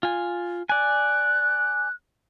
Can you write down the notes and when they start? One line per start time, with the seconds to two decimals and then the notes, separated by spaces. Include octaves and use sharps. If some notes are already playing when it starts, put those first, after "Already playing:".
0.03 F4 G#5
0.69 D5 G#5 F#6